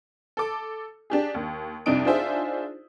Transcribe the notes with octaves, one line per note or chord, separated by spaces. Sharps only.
A4 D6
D4 G4 G#4
D#2
C2 F2 D4 D#4 D#6 D7
D4 D#4 F4 G#4 C5 E5